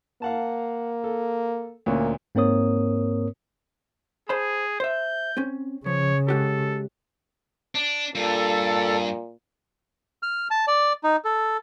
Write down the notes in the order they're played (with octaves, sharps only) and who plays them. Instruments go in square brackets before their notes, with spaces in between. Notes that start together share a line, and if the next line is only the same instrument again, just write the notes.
[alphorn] A#3 [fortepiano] F5 F#5 A5
[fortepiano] A4
[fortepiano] D2 A#2 C#4 [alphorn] A#3
[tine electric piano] G#2 A#3 C4 A#4 C#5 D#6
[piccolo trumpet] G#4 [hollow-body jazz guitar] C5 A5 B5
[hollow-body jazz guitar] C5 E5 [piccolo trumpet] G6
[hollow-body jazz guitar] C4 C#4
[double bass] C#3 [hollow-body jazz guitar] F3 [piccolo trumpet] C#5
[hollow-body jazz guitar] G#3 F#4 G4 [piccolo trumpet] A4
[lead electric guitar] D4
[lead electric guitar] G2 [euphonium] A#2 [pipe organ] A4
[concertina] F6
A5
D5
D#4
A4